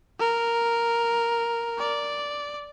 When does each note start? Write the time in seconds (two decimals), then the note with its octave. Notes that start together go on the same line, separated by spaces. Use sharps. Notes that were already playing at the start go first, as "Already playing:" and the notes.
0.19 A#4
1.79 D5